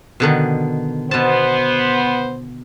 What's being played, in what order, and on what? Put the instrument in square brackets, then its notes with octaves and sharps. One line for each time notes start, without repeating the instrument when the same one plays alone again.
[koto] B2 D3 D#3
[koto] B2 A5 [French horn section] B3 C5